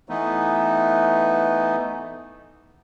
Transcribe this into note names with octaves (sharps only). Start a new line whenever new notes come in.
E3 A3 B3 D#4